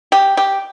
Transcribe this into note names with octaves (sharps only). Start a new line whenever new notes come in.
G4
G4